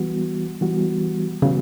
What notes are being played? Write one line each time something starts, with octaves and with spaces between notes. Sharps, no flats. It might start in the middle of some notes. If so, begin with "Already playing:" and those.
Already playing: E3 G3 B3 F#4
E3 G3 B3 F#4
C#3 E3 G3 B3 F#4